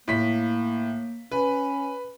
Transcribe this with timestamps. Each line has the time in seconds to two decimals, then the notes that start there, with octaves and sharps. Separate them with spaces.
0.08 A2 A#3 B6
1.32 C#4 B4